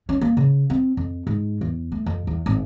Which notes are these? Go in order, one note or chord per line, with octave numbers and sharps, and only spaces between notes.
C#4
A#3
C#3
C4
F2
G#2
E2
A3
F2
E2
G#1